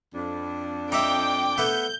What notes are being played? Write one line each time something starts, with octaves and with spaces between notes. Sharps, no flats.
F2 D4
D#4 E5 G5 D6
A3 B3 G6